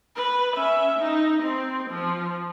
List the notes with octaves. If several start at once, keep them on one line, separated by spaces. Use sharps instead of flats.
B4
C#4 E5
D#4
C4
F3